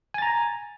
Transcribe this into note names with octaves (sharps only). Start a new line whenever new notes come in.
G#5 A#5 A6